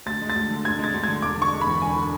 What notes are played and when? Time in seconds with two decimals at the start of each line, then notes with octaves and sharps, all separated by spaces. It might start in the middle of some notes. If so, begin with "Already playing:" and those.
0.06 D2 A6
0.22 G#3
0.30 A6
0.35 D2
0.50 D3
0.65 D2 G#6
0.79 G#3 A6
0.94 D2
1.04 G#6
1.08 D3
1.22 E1 D6
1.37 D3 C#6
1.52 G#3
1.61 B5
1.67 E2
1.82 E1 G#5
1.96 D3